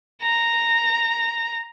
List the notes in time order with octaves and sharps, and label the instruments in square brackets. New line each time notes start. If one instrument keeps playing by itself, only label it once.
[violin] A#5